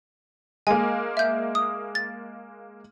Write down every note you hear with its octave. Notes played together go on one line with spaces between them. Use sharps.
G#3 A#3 G#5
E5 G6
D#6
A6